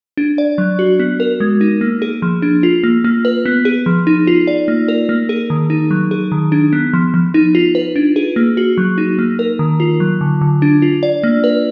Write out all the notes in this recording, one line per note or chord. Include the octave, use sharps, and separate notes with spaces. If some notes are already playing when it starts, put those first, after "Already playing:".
D4
D5
F#3
F#4
B3
A#4
G#3
D#4
A#3
G#4
F3
D4
F4
A#3
A#3
B4
B3
G#4
F3
D#4
F4
D5
A#3
A#4
A#3
G#4
D#3
D#4
F#3
G#4
D#3
D4
B3
F3
F3
D#4
F4
B4
D4
G#4
A#3
F#4
F#3
D#4
A#3
A#4
D#3
F4
F#3
D3
D3
D4
F4
D5
A#3
B4